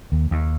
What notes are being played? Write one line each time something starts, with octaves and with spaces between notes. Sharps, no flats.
D#2
D#2